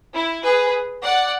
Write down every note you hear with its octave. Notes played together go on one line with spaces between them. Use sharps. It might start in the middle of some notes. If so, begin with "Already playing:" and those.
E4
G#4 B4
D5 F#5